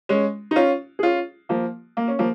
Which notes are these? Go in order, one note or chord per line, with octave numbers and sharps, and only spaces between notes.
G#3 C#4
D#4
C#4 F4
G#4
C#4 F4
F3 A#3
A#3
C#4
F3 A#3